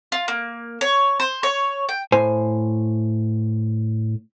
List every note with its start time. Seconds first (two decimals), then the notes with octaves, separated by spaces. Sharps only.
0.12 F4
0.28 A#3
0.81 C#5
1.20 C5
1.43 C#5
1.89 G5
2.12 A2 C5 G#5